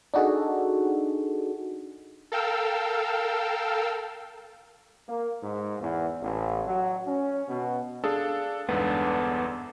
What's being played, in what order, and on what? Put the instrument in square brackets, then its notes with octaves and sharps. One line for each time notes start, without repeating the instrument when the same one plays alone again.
[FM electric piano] D4 D#4 F#4 G#4 A4
[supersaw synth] A4 A#4 F5 G5 E6
[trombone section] A#3
G#2
E2
A1
F#3
C#4
B2
[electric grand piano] D4 A4 [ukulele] G#4 F5
[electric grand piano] G1 E2 G#2 [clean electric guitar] B3 [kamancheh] D4 A4